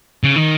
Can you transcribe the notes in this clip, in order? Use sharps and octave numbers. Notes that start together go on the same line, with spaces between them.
C#3
D#3